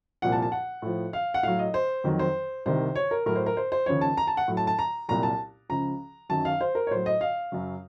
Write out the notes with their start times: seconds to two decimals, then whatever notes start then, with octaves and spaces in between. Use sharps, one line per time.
0.22 C2 A#2 F3 F#5
0.32 A5
0.42 A5
0.52 F#5
0.82 A2 F3
1.13 F5
1.34 F#5
1.43 A2 F#3 F5
1.59 D#5
1.74 C5
2.04 F2 D#3 F#3
2.19 C5
2.66 C2 C3 D#3 C5
2.96 C#5
3.11 A#4
3.26 A2 F#3 A#4
3.36 C5
3.46 A#4
3.57 C5
3.72 C5
3.86 D#2 C#3 F3 C#5
4.01 A5
4.17 A#5
4.27 A5
4.37 F#5
4.48 A2 F#3
4.57 A5
4.67 A5
4.79 A#5
5.08 C2 A#2 F#3 A#5
5.23 A5
5.69 C#2 C#3 F3 A#5
6.29 F#2 D#3 F#3 A5
6.45 F5
6.61 C5
6.75 A#4
6.87 C#5
6.91 A2 F#3 C5
7.06 D#5
7.21 F5
7.52 F#2 C#3 F#3